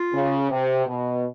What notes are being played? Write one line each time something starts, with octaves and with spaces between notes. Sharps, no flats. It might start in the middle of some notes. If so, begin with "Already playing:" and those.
Already playing: F4
C#3
C3
B2